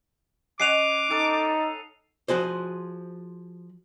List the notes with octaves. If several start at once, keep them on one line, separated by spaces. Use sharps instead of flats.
C#4 D#5 F#5 D6 C7 D#7 F7
D#4 A4 A5
F3 F#4 G#4 C5